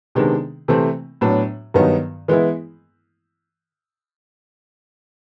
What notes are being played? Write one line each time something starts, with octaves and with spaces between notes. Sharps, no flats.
C3 D#3 G#3 B3 D4
C3 E3 A3 C4
A2 F#3 B3 D4
G2 D#3 F#3 B3 D#4
E3 G#3 B3 E4